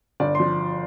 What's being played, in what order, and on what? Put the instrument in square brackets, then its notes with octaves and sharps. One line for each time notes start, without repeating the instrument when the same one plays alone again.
[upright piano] G1 D5
F3 C6